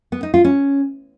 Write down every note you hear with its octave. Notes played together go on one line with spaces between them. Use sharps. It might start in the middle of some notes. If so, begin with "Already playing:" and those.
B3
D#4
F4
C#4